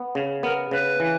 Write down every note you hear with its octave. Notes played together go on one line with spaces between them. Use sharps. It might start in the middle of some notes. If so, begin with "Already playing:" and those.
Already playing: B3
C#3
B3 A#4
C#3 B4
E3